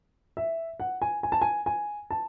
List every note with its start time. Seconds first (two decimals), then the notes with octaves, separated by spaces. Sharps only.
0.37 E5
0.80 F#5
1.02 G#5
1.23 G#5
1.32 A5
1.41 G#5
1.66 G#5
2.11 A5